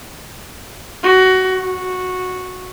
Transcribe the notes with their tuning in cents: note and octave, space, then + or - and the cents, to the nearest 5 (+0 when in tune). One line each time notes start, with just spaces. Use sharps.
F#4 +20
F#4 -10